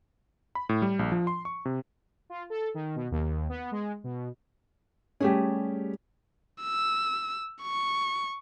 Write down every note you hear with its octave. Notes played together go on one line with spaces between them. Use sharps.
B5
A2
G3
A#1
F3
C6
C#6
C3
F4
A4
D#3
B2
D#2
B3
G#3
B2
G3 A3 C#4 G4 G#4
E6
C#6